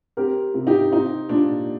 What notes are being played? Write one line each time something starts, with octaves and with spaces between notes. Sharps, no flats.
C4 G4 A#4
C3
D#4 G4
C4 D#4
A#2 D4